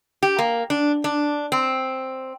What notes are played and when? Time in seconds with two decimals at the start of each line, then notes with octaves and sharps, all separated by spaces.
0.23 G4
0.39 A#3
0.70 D4
1.04 D4
1.52 C4